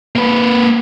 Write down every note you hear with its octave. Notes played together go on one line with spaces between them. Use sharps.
A#3 B4